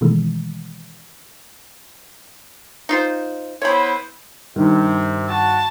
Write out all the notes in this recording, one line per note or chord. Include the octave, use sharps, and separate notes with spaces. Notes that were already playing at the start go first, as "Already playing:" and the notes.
B2 D#3 E3 G#3 A3
D#4 F4 C5
B3 E4 C5 C#5 B5
G2 C3 D#3
F#4 A5